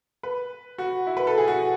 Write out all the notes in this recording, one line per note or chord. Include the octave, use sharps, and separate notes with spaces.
B4
F#4
E4
B4
A4
G#4
F#4